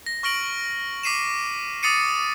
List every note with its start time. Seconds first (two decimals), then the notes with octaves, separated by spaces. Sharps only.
0.06 A#6
0.23 C#6 F6 A#6 D7 F#7
1.03 D6 B6 C7 D#7 E7
1.83 D6 D#6 A6 C7 C#7 D#7